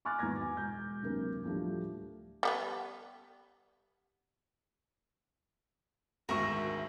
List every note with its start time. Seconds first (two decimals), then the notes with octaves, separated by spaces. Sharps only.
0.05 G#5 C#6 D6 F6 F#6 A6
0.19 G#1 E2 B3 A#5 G#6 A#6
0.37 F#4 G#5
0.57 E1 G6
1.02 F#1 D2 C3 A#4
1.44 D2 A2 F3 G3 A3
2.43 G3 A#3 B3
6.29 G#1 D2 A#4 E5 C#6 A#6